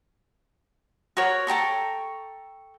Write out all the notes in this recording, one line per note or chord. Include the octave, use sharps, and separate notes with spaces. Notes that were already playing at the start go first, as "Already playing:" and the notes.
F#4 A#4 C#5
A4 G5 A#5 C#6